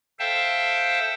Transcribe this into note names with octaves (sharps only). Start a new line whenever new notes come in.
A4 C5 E5 F5 G5 A5